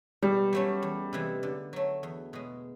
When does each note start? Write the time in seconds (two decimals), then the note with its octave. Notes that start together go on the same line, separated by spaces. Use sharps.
0.22 B2 G3
0.53 F#3 A3 C#4
0.82 E2
1.13 C3 E3 G#3
1.43 D3
1.73 F#3 A3
2.03 E2
2.33 B2 G#3